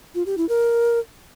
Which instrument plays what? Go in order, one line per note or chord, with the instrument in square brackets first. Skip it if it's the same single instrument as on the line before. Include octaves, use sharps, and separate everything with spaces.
[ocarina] F4
G4
E4
A#4